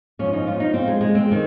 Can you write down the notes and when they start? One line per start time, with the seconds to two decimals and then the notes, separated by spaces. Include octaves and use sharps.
0.19 G#2 F3 C#4
0.33 D#4
0.47 F4
0.60 D#4
0.74 C4
0.88 G#3
1.01 G#3
1.15 C4
1.32 D#3